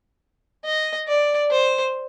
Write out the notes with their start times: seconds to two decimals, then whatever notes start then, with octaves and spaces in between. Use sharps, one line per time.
0.65 D#5
1.07 D5
1.51 C5